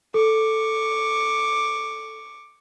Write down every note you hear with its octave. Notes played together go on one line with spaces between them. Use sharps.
A4 C#6 D6